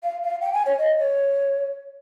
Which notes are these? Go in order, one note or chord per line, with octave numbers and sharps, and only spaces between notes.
F5
F5
G5
G#5
C#5
D#5
C#5